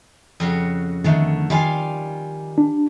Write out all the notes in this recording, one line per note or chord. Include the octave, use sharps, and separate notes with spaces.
F2 C#3 F#4
D3 D#3 A3
D#3 G3 F4 F5 G#5
D4